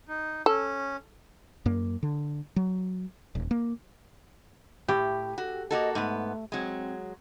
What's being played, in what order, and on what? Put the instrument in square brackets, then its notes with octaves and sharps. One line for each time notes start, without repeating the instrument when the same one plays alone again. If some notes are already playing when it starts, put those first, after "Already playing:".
[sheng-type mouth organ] D#4
[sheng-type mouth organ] C#4 [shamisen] A4
[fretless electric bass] F#2 A#3
D3
F#3
D#1
A#3
[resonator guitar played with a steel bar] A2 [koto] G4
[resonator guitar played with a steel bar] F#4 [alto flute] A4
[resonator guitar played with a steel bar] A#3 F#4 A4 [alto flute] D#5
[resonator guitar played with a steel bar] G#2 B3 [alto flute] A3
[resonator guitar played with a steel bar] F#3 G#3 [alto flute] C4